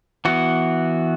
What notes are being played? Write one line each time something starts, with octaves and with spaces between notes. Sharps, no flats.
E3 B3 F#4